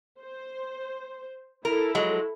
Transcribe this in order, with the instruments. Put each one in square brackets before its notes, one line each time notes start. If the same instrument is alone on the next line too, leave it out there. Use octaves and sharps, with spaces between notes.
[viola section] C5
[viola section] E4 A4 [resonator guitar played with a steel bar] A#4
[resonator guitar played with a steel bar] F3 F#3 G#3